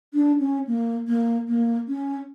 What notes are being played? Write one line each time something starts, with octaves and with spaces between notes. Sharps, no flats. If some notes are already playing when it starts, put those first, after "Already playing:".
D4
C#4
A#3
A#3
A#3
C#4